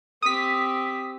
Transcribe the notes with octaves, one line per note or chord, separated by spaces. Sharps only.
C4 G4 D#6 B6